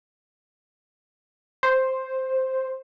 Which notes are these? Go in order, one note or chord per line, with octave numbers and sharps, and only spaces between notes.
C5